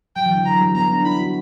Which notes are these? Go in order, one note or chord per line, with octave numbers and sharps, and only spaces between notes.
F#3 G5
E3
D3
F#3 A#5
G3
B3 A#5
D4
E4 B5
F#4